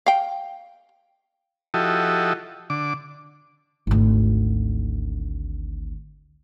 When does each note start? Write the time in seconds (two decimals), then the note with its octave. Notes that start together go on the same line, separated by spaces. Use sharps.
0.06 F5 G5
1.74 F3 E4 F#4 G4 A4 D#5
2.70 D3 D6
3.87 G#1 D2